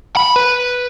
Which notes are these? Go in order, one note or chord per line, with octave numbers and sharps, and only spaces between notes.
B5
B4